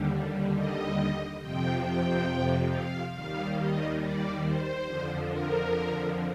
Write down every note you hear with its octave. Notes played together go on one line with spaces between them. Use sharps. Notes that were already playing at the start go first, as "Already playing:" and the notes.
Already playing: D#2 D3 G3
D#5
F2 C3 F3 G5
G5
F5
D#2 D#3 G3 F5
D#5
D5
C5
F2 D3 F3
A#4